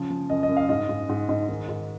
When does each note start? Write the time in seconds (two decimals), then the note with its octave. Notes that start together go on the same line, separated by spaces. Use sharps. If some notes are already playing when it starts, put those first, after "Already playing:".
Already playing: C#3 F3
0.10 F3
0.30 F#2 D#5
0.43 D#5
0.49 F#2
0.57 F5
0.69 G#2 D#5
0.89 G#2
1.09 G#2
1.29 G#2
1.49 D#3
1.69 G#2